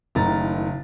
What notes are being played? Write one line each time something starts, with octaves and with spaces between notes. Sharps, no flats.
F#1 A2 D#3 A#5 A6